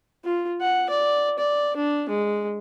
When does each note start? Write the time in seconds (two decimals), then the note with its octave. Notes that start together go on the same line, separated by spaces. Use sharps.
0.24 F4
0.61 F#5
0.89 D5
1.38 D5
1.76 D4
2.09 G#3